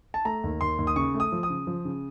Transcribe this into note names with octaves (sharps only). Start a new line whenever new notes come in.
A5
A3 A#5
D#2
D#2 C6
D#2
D#6
C#3 C#6
A3
D#6
F3
D#6
C#3
F3
C#3